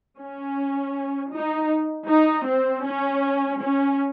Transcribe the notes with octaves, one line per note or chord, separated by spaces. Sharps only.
C#4
D#4
D#4
C4
C#4
C#4